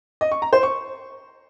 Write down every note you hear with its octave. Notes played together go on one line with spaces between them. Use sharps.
D#5
C#6
A#5
C5
C#6